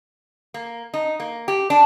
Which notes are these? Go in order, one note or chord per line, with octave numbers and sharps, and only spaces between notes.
A#3
D#4
A#3
G4
D4